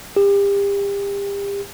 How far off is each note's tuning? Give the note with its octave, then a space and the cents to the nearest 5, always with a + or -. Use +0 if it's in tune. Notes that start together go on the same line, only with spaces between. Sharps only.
G4 +35